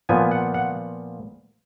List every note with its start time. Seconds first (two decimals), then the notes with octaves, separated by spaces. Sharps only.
0.09 A#2 F3 B3 G#5
0.31 F#5
0.54 F#5